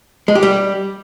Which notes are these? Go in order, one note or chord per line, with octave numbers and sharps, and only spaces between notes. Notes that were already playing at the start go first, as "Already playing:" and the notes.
G#3
G4
G3